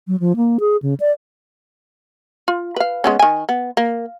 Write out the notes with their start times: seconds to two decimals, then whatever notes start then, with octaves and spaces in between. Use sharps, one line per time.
0.08 F#3
0.20 F3
0.36 A#3
0.60 G#4
0.82 C#3
1.00 D5
2.48 F4
2.76 B4 F5
3.04 G#3 B3 C#4
3.19 D#3 G#5
3.49 B3
3.77 A#3